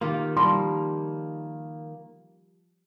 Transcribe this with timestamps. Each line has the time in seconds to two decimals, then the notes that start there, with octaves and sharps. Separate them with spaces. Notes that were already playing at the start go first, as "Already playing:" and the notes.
0.01 D#3 A#3 F4 G4
0.37 F3 G3 A#4 C6